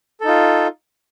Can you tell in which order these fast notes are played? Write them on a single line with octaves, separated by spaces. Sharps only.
A4 D#4 F4